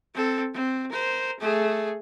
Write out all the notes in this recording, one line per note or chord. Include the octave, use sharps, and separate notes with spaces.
C4 A4
C4
A#4 C5
A3 G#4